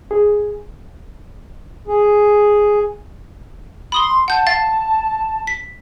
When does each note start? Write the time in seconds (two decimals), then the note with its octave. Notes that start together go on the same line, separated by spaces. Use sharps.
0.11 G#4
1.88 G#4
3.92 B5 C6 D#6 G7
4.28 F#5 A5 G6
4.47 F5 A6
5.47 B6